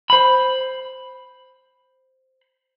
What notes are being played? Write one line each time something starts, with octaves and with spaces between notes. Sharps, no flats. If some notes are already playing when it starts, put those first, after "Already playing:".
C5 B5